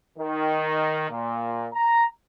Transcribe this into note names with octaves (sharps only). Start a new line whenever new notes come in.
D#3
A#2
A#5